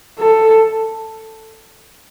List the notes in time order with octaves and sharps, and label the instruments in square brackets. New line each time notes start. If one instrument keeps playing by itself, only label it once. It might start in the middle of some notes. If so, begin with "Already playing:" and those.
[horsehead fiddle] A4